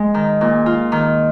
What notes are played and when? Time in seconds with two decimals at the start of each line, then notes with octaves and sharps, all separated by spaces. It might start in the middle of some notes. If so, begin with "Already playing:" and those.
Already playing: G#3
0.14 D#3
0.41 A#2
0.66 F4
0.92 D#3